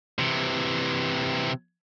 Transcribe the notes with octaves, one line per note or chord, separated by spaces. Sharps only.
C3 E3